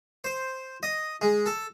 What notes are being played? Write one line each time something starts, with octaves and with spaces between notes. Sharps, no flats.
C5
D#5
G#3
A4